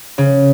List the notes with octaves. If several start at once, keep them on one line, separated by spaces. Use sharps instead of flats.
C#3